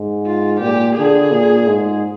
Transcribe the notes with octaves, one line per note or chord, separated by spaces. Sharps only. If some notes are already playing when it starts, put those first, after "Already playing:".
Already playing: G#2
F4
A#2 G4
D3 G#4
A#2
G#2